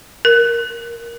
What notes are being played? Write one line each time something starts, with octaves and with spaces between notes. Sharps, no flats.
A#4